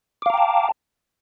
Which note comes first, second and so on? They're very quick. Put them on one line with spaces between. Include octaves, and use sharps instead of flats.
D6 F5 A#5 G5 A5